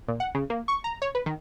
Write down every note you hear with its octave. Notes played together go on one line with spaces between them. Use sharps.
A#2
F#5
C#3
A#3
C#6
A#5
C#5
B4
D#3